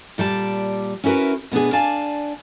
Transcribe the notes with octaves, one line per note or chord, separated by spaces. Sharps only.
A#2 G3 D5 A5
C#4 E4 F#4 A#4 B4
B2 B3 D4 G#4
D4 D5 F5 G#5 A5